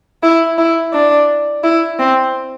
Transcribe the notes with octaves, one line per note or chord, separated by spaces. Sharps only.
E4
E4
D4
E4
C4